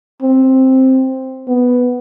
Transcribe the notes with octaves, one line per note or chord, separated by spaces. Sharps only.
C4
B3